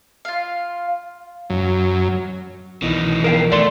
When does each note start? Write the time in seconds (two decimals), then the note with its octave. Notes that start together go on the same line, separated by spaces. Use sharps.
0.25 F4 F5
1.50 F#2
2.82 C2 B2 D#3 E3 D#5
3.24 B2 F3 A#4 F5 G5
3.52 D#2 A3 D5 C6